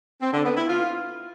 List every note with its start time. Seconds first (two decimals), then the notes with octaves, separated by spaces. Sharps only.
0.21 C4
0.33 D3
0.45 B3
0.57 E4
0.68 F4